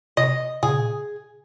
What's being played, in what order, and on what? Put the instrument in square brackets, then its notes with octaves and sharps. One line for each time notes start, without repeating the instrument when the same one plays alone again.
[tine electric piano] C3 [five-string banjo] D#5
[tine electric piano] A#2 C#3 [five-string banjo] G#4